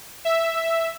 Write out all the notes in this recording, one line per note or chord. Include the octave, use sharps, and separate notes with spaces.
E5